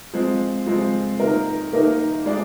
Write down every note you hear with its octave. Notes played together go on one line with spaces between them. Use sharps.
F3 G#3 C4
F3 G#3 C4
D#3 A#3 D#4 A#4
D#3 A#3 D#4 A#4
G#3 D4 G4 D5